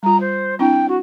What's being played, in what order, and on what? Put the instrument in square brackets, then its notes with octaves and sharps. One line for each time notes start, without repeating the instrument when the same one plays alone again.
[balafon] G3 F4 [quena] A#5
[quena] C5
[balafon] C4 D4 E4 [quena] G5
[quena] F#4